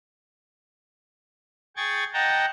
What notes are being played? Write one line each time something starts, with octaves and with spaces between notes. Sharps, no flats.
G#4 G5 C#6 G#6 A6
D#5 F#5 G5 A5 A#5